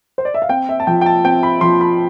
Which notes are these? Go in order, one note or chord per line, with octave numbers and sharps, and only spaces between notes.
C5
D5
E5
F5
C4 G5
E5
A5
F3 G5
G5
A5
C4 G5
B5
F3 C6
B5